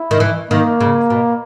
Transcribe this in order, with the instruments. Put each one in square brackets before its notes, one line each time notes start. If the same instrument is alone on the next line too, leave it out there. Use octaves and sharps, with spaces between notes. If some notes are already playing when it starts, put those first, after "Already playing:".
Already playing: [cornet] E4
[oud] D#3
E3
[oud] D#3 [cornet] A#3
[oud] C#3
B2